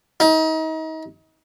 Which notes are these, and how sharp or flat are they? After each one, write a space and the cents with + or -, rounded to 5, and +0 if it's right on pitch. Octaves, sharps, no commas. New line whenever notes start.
D#4 +35